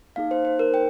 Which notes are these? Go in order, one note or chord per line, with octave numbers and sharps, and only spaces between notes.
A#3 D#4 G#4 F5
C5
C5
A#4
G5